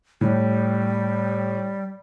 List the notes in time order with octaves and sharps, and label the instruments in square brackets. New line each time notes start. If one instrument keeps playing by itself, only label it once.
[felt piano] A2 [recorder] G3